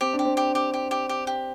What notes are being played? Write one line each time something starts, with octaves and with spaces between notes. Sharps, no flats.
C4 G4
D4
G4
C4
G4
G4
G4
G4
G4
G4